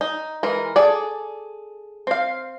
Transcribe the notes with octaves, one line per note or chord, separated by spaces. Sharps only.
D#4
E3 G#3 A#4
G#4 A4 D5
C4 F5